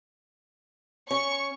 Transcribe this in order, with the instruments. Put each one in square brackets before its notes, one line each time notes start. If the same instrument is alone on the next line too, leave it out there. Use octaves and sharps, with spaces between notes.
[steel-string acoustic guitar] C#4 [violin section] C#6